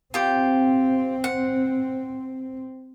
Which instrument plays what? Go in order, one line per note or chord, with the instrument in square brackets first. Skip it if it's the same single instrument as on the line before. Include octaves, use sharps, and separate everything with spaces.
[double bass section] C4 [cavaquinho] F4 G4 G5
[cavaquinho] F#5